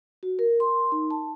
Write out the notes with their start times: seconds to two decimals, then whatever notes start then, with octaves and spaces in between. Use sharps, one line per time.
0.23 F#4
0.39 A#4
0.60 C6
0.92 D#4
1.11 A5